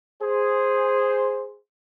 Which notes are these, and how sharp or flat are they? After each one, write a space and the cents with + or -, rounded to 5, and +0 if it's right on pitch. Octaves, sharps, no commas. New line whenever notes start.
G#4 -5 C5 +0